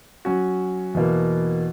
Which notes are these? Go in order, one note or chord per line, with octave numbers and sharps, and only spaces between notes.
F#3 C#4 F#4
E2 B2 A#3